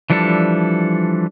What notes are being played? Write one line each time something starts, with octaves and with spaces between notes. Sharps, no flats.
E3 F3 G3 D4 A4